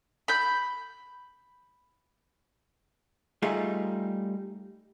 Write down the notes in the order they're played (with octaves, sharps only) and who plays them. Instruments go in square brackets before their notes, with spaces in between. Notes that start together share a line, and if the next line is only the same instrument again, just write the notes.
[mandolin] B5 G6
[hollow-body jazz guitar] G3 A3 D#4 F4 G4 G#4